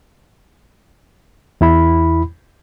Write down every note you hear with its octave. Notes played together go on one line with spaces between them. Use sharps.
E2 E4 B5